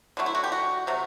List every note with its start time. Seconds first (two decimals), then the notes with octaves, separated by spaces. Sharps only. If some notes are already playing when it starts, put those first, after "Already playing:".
0.17 D3 F#3 A3
0.26 E4
0.35 F#4
0.44 G4
0.52 F#4
0.87 C3 F#3 A3